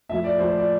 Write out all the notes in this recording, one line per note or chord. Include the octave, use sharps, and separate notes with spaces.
A2 F3 E5
D5
A2 F3 C5
C5
D5